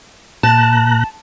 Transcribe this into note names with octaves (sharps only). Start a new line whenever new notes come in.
A#2 A5 A#5 F#6